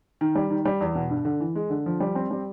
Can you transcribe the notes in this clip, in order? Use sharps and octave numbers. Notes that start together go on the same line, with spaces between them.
D#3
G3
D#3
G3
E2
B2
G2
D3
E3
G#3
D3
F3
G3
C4
G3